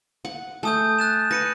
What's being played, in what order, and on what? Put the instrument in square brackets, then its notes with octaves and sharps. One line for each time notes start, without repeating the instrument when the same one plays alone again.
[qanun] F#5
[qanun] A3 [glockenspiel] G#5 D#6 G6
[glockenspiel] F#6 A6 E7
[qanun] B4 [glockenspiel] A#6 C#7 D#7